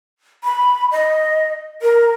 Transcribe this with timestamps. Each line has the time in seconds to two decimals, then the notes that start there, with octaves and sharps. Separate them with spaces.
0.44 B5
0.92 D#5
1.82 A#4